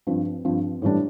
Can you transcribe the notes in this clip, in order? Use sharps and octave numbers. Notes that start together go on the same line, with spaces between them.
G2 F3 C4
G2 F3 C4
A2 E3 G3 D4